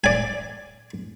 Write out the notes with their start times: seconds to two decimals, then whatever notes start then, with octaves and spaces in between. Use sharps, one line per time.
0.04 D5 G#5